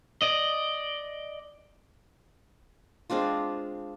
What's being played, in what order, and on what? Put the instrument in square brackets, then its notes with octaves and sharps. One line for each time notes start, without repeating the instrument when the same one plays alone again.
[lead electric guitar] D5 D#5
[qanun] G#3 C4 D4 F4